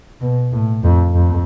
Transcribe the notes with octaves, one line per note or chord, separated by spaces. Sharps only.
B2
A2
F2
F2